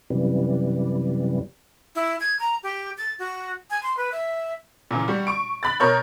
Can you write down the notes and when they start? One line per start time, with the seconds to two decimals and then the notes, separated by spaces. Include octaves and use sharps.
0.10 F#2 C3 E3 G3
1.95 E4
2.20 G#6
2.40 A#5
2.63 G4
2.98 A6
3.19 F#4
3.70 G#5
3.83 C6
3.97 B4
4.12 E5
4.91 A#2 C#3 E3
5.08 G3 F#4
5.27 C#6 D7
5.63 B5 F#6 A6
5.80 B2 A#4 C#5 G6